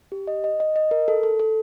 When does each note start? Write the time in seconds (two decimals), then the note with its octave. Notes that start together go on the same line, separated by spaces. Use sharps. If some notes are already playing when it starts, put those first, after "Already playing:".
0.12 G4
0.27 D#5
0.44 D#5
0.60 D#5
0.76 D#5
0.91 A#4
1.08 A4
1.23 A4
1.39 A4